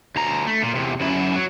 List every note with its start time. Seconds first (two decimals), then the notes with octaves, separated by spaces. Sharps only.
0.16 D2 A#5
0.47 A3
0.63 A#2
0.75 E2 C3
1.01 F#2 E4
1.36 F#3